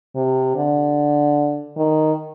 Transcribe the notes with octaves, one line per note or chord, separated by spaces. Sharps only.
C3
D3
D#3